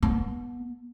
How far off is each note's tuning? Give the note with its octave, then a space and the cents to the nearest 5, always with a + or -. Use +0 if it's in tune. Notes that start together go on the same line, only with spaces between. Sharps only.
B3 -25